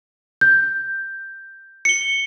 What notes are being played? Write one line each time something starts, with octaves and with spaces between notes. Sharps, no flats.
G6
C#7 G7